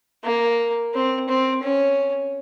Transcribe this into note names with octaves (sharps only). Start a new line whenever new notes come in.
A#3
C4
C4
C#4